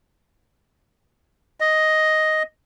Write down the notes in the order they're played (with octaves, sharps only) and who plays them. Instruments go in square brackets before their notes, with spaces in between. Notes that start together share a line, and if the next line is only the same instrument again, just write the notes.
[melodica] D#5